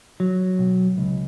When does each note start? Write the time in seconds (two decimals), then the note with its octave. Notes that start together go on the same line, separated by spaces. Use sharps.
0.20 F#3
0.59 B1
0.98 C#2